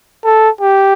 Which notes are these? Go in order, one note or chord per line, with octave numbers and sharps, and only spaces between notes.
A4
G4